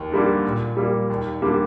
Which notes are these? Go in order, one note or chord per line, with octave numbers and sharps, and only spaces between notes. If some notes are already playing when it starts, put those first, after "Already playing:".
Already playing: D#2
D3 G3 A#3
A#2
G3 A#3
D#2
D3 G3 A#3